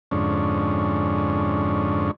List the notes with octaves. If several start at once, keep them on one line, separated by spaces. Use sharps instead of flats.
F2 G#2 D3 C#4